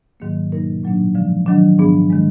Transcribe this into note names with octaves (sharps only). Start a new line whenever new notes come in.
G#2 D#3 F#3 A#3
B2 F#3 A#3 D#4 A#4
A#2 F#3 A#3 D4
D3 F3 G#3
D#3 F#3 D4
G#2 F3 B3 D4 G#4
D#3 G#3